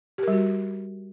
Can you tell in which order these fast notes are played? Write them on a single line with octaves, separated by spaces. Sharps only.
G4 A#4 G3 F#4